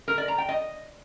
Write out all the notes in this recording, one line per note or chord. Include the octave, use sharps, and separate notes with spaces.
A#4
D5
A#5
G5
D#5